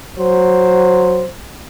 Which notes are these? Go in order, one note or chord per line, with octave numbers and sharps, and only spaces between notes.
F#3 C5